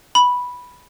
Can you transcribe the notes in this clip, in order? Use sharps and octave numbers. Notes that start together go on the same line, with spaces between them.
B5